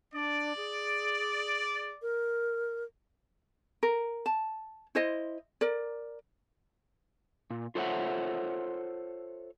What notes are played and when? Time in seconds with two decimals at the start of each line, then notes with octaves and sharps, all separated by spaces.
0.13 D4 D5
0.57 G#4
2.02 A#4
3.83 A#4
4.26 A5
4.95 E4 C5 D#5
5.61 A#4 D5
7.50 A#2
7.75 F4 A4 C5 C#5 E5 F#5